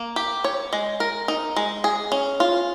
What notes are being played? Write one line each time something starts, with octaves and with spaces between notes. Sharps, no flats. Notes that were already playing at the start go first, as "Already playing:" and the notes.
Already playing: A#3
G4
C#5
G#3
A#4
D#4
G#3
G#4
C#4
F4